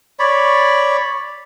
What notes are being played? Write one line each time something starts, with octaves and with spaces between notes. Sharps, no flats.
C#5 D5 B5